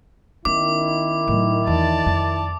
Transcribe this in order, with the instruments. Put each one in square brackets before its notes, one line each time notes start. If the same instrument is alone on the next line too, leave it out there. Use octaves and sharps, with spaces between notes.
[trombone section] D#3 E4 [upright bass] B3 C#4 [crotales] D6
[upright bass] A2 F#3
[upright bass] E2 [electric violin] D5 A5
[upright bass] F2